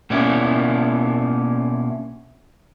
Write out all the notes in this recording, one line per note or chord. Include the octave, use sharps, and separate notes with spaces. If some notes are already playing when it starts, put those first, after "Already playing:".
B2 A#3 C#4 D4 E4